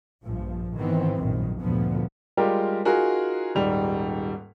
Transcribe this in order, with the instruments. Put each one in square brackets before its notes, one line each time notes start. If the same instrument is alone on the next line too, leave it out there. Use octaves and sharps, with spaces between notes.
[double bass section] A#1 G2 F3
G#2 D#3 E3 B3 C4
A#1 F#2 D#3
D2 G2 A#2 D3 F3 B3
[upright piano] G3 G#3 F4 G4 A#4
D#4 F4 F#4 G#4 A#4
D#1 G#2 G3 F7